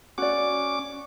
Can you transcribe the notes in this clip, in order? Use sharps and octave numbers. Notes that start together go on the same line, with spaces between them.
C#4 F#4 D5 D6